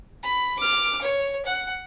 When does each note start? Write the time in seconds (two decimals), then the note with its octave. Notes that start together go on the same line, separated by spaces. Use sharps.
0.23 B5
0.60 D6 F6
1.02 C#5
1.46 F#5